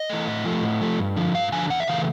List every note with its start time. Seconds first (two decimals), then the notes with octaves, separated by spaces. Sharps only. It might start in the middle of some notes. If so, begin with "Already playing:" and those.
Already playing: D#5
0.10 E3 A3
0.26 A2
0.45 F3 A3
0.62 A2
0.81 F3 A3
0.98 G2
1.16 D3 F3
1.35 G2 F5
1.52 D3 F3 G#5
1.70 E2 F#5
1.80 E5
1.87 C#3 E3 A3 F5